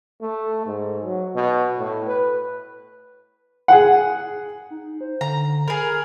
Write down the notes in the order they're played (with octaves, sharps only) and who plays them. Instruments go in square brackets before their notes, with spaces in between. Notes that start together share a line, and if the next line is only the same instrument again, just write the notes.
[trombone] A3
G#2
F#3
B2
A2
B4
[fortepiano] G#4 F#5
[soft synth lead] D#4
C5
[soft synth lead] D3 [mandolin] A#5
[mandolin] G#4 A#4 [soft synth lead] B5